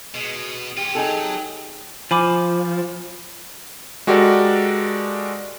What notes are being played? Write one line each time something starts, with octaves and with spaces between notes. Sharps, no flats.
B2 G#3
C#4 F4 G4
F#3 D#4 G#4 A4
F3 G#5 B5 D6
G#3 F#4 G4 A4 A#4 D5